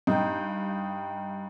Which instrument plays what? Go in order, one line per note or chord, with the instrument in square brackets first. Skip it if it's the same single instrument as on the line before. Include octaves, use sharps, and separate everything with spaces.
[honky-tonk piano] G2 [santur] D#4 F5 G5